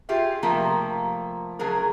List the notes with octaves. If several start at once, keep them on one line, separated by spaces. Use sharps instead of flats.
F4 G4 G#4 E5
C3 F3 A3 A#3 A#4
C#3 F#3 A3 G#4 A#4